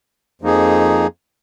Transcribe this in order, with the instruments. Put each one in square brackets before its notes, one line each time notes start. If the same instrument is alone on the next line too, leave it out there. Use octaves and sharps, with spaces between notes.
[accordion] F2 F3 A#3 D#4 G#4